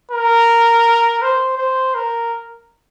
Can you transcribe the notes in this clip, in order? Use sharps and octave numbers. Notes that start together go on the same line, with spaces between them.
A#4
C5
C5
A#4